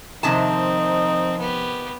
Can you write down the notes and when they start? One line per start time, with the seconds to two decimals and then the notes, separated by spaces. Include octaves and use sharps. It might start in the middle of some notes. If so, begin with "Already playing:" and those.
0.23 C3 D#3 F3 C4 D#4 A5
1.40 B3 G4